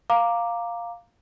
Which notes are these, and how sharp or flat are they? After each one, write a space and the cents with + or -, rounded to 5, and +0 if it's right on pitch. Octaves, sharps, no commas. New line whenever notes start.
F5 +0 A#5 +0 D6 +0